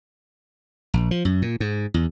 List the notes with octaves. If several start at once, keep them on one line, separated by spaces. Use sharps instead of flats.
A#1
F3
F#2
A#2
G#2
E2